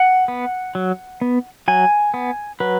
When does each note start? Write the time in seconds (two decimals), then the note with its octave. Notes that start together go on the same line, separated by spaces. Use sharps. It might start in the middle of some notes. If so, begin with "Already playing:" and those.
Already playing: F#5
0.28 B3
0.75 F#3
1.21 B3
1.68 F#3 G#5
2.14 B3
2.60 F#3 B4